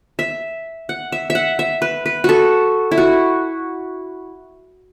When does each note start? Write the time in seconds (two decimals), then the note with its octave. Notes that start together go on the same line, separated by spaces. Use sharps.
0.19 E5
0.89 F#5
1.12 E5
1.30 E5
1.35 F#5
1.59 E5
1.82 B4
2.06 B4
2.24 F#4 A4
2.91 E4
2.98 F#4